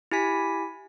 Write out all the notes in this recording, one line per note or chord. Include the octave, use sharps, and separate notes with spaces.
E4 G4 G#5 B6